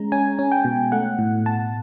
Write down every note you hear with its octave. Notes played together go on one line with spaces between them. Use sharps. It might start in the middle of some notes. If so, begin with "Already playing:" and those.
Already playing: G#3 C#4 A#5
C#4 G#5
C#4
G5
B2
A3 F#5
A2
A2 A5